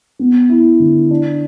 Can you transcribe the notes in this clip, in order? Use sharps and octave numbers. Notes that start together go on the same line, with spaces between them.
B3
E4
D3
D4